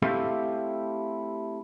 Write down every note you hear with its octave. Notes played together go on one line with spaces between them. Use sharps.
A3 C4 E4 G4 A4 F5